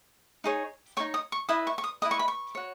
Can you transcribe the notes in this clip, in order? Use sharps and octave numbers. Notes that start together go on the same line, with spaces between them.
D#4 G#4 C#5
D#4 G#4 C#5 C#6
D#6
C#6
E4 B4 D#5 D#6
C#6
C#6
D#6
E4 B4 D#5 D#6
C#6
B5
C#6
F#4 C#5